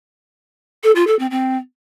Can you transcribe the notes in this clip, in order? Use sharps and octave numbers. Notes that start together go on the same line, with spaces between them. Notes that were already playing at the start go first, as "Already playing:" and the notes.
A4
F4
A4
C4
C4